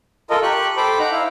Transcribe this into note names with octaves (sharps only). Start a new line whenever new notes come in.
F4 A4 A#4 D#5
G4 C#6 F#6
A4 C5 G5 B5 D6
D#4 F#5 A#5
E4 F5